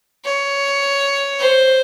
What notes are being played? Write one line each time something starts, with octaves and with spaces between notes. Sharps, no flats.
C#5
C5